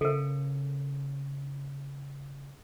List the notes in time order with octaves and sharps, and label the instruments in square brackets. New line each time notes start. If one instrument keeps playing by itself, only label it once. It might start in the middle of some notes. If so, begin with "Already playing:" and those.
[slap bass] C#3 [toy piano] A4 A#4